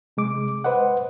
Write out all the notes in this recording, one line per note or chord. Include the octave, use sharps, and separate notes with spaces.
C3 G#3 D6
B4 C5 D#5 F#5